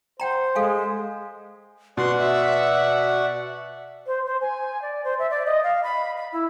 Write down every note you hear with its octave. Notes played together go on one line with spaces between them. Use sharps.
C5 F#5 G5 A#5
G#3 A4 F5 G#5
B2 D5 F#5 C6 C#6
E5
C5
C5
G#5
D5
C5
E5
D5
D#5
F5
B5
B5
E4